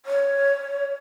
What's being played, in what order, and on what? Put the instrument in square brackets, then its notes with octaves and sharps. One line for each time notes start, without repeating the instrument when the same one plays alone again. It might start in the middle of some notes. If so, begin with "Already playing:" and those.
[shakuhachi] C#5